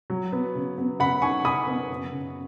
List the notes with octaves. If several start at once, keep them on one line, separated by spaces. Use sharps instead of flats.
F#3
B3
C#3
B3
C#3 F#5 B5
D#4 G#5 C#6
C#3 B5 D#6
B3
F#2
C#3